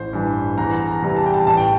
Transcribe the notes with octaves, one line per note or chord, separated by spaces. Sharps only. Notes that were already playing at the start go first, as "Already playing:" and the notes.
Already playing: A1 C5
G2 E3
E2 A#5
A#5
C3 E3 G3
A5
G5
A5
A1 A5
G5